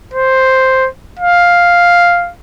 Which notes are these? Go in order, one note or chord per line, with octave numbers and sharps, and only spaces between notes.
C5
F5